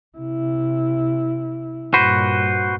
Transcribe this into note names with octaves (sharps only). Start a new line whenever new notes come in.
C3 E4
G2 A#2 F#4 B4 C5